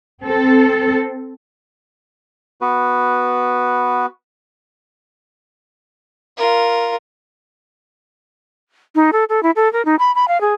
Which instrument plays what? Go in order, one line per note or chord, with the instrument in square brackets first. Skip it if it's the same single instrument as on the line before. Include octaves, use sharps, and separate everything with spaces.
[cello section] C4 A4
[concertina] B3 F#4 B4
[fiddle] F4 A#4
[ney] D#4
A4
A4
E4
A4
A#4
D#4
B5
B5
F5
G#4